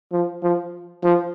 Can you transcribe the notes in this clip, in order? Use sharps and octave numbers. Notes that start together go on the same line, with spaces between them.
F3
F3
F3